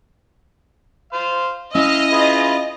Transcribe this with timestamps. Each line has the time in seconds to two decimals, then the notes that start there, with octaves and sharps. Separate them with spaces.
1.13 C5 F5
1.75 C#4 E4 D#5 F5 E6
2.11 F4 G#4 B4